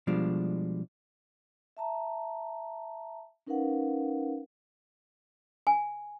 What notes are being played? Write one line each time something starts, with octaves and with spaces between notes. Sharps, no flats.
B2 F3 G3 G#3 D4
E5 A5 A#5
C#4 D#4 A#4 B4 F5 F#5
G#5